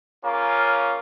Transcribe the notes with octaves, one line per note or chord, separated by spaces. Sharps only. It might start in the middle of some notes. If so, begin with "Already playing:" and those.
C#3 A#3 C#4 F4